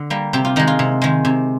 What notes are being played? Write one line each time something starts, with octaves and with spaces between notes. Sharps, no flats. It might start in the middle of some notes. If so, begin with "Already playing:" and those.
Already playing: D3
G3 A#3
C3 G4
F4
D#3 G#3 D#4
F4
C3
D#3 G#3
C3